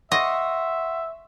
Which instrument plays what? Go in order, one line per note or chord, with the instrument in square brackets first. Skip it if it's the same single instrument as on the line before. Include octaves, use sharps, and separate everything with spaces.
[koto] D#5 [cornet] E5 [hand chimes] F#5 C6 C#6